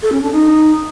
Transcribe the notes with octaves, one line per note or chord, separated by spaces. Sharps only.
A4
C#4
D4
D#4